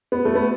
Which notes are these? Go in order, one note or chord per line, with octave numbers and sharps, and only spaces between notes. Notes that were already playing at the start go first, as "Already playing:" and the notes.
B3
A3
B3